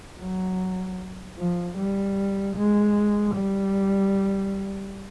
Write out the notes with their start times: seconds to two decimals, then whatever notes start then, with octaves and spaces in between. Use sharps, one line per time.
0.21 F#3
1.38 F3
1.78 G3
2.56 G#3
3.35 G3